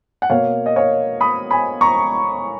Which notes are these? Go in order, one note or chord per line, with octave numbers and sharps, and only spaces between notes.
F#5
B2 A#3 C#5 F5
D#5
C#5 F5
B5 D#6
G#5 B5
A#5 C#6